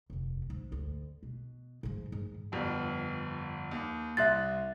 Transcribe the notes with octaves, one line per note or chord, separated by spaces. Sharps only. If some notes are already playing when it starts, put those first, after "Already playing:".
F1 D#2
G#2
D2
B2
G#2 F3
G#2 D#3
G1 F2
D#2
C2 E5 C6 F#6 A6